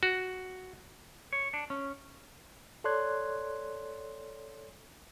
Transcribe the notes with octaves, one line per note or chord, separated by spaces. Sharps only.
F#4
C#5
D4
C#4
A4 C#5 D5 C6 F#6 G#6